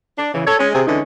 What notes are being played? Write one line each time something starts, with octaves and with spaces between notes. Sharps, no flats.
D4
C#3 E3
A4 C#5
G#3 C#4
C3 G#4
D3 E3 G#3 C#4 D#4